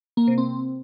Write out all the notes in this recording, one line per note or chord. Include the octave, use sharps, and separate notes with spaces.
A#3
C3
C4